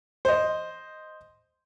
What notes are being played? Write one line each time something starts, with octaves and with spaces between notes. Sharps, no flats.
C5 D#5